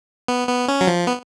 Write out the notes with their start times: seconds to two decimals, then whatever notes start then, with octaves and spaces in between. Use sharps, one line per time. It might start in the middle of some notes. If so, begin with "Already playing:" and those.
0.28 B3
0.48 B3
0.68 C#4
0.81 F#3
0.87 F3
1.07 B3